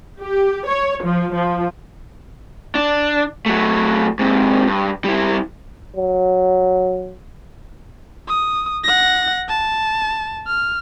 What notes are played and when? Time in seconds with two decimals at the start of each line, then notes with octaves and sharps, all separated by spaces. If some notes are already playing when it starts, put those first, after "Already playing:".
0.22 G4
0.68 C#5
1.05 F3
1.35 F3
2.75 D4
3.46 F#3 A3
4.19 G#2 C3
4.67 G2
5.04 G3 E4
5.96 F#3
8.28 D#6
8.84 F#5 A#6
9.48 A5
10.47 F6